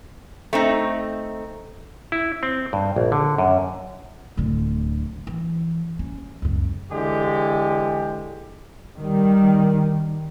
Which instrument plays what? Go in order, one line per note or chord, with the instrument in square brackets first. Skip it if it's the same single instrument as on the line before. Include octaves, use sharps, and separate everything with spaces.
[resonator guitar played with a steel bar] A3 C4 D#4
[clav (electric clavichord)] E4
C4
G2
A#1
D3
F#2
[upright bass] D1 D3
E3
C#4
C#2 F#2
[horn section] D3 E3 G#3 G4
[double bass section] D#3 G3